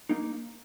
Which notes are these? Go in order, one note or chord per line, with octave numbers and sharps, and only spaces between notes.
A#3 D#4